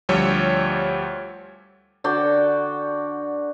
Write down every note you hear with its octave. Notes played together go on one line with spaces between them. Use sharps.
D2 F3 G3 C#5 E6
D3 F#4 D5 G5